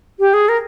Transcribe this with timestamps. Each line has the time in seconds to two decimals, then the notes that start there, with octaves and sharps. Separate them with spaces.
0.20 G4
0.34 G#4
0.49 A#4